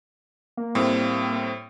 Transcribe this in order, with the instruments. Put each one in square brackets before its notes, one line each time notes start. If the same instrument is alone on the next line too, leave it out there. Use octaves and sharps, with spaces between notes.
[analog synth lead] A#3
[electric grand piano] A2 G3 C4